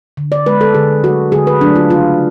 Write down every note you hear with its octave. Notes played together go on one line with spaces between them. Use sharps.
D3
D5
G#3 B4
A4
D3 G#4
F#3 A3 F#4
D3 G#4
B4
F#3 A3 D4
F4
C#3 F4